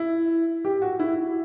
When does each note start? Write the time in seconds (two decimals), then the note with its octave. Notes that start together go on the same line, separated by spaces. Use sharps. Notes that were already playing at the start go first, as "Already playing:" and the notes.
Already playing: E4
0.65 G4
0.82 F#4
1.00 E4